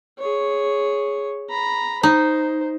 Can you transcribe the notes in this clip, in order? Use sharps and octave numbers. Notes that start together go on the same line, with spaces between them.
G#4 C#5
A#5 B5
D#4 C5